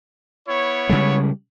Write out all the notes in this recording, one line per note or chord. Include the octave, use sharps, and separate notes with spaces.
B3 E4 C#5
C#3 G3 G#3